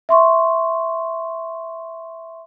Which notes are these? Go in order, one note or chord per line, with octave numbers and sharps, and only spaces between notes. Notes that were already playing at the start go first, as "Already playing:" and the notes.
E5 C6 C#6